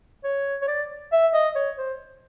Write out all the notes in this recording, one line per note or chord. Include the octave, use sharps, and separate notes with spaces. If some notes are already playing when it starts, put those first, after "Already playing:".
C#5
C#5
D5
E5
D#5
C#5
C5